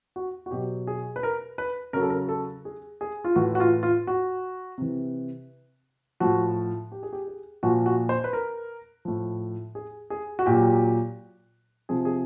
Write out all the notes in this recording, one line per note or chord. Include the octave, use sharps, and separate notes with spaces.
F#4
F#4
B2 F#3 G4
G#4
B4
A#4
B4
C#3 F#3 A#4
A4
A#4
A4
G#4
G#4
F4
A2 E3 F#4
F#4
F4
F4
F#4
C3 E3
A2 F3 F#4
G4
G#4
G4
G#4
A#2 F3 F#4
F#4
C5
B4
A#4
A2 F3
G#4
G#4
F#4
A#2 F#3 G4
C3 F3 G#4
G#4